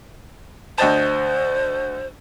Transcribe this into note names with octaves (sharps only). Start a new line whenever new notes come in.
D2 C5 D#5 A5